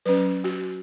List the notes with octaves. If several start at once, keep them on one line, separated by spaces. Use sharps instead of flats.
F#3 C#4 B4
F#4